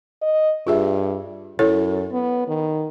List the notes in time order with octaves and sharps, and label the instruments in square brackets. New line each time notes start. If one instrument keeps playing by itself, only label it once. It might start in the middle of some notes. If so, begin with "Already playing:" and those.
[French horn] D#5
[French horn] G2 [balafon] F4 G#4 E5
[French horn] F#2 [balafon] E4 A4 C#5
[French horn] B3
D#3